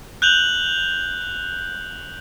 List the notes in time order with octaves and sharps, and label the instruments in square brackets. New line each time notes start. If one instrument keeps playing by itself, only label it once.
[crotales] F#6 G6 F7 F#7